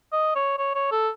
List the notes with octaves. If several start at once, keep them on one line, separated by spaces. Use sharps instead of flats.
D#5
C#5
C#5
C#5
A4